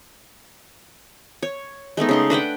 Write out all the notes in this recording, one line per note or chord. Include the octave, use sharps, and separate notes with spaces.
C#5
G#3 A3 B3 D#4
C#3 D#4 C6
D4 B4 F#5 G5